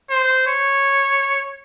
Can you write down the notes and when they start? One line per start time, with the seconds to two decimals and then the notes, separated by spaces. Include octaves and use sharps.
0.11 C5
0.47 C#5